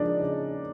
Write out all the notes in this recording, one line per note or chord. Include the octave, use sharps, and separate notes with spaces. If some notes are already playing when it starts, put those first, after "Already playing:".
Already playing: C#3 F3 G#3 D4 D#4 D5
C#3